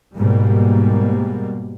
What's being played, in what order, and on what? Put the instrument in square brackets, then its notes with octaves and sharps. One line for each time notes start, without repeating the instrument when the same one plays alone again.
[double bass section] G#2 B2 G3 A#3